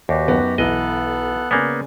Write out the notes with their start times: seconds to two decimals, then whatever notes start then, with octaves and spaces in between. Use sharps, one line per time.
0.09 D#2 F#4 G4 B4 D5 G5
0.28 F#2 B3 D#4
0.58 B1 E3 B3 A4 D#5 F#6
1.51 C#3 A#3 B3 D5 G#5